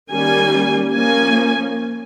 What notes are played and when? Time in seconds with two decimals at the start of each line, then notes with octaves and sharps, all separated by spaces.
0.12 D#3 G3 A#3 C#4 G#5
0.94 F3 A#3 C#4 G#5